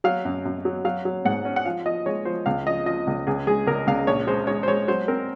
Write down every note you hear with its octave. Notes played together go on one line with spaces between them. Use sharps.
F#3 F5
F#2
F#2
F#3
F#3 F5
F#3
G#2 F#5
C#4
F#5
F3 F5
F3 D#5
G#3 C#5
F3 C5
C#2 F5
F3 D#5
F3 D#5
C#2
C#2 G#4
G#3 G#4
C#2 A#4
C#2 F5
A#1 C#5
G#3 C5
G#3 C#5
C5
G#3 C#5
F#3 C5
C4 A#4